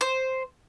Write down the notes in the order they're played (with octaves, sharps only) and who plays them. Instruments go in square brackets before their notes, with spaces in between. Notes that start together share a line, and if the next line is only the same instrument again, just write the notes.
[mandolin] C5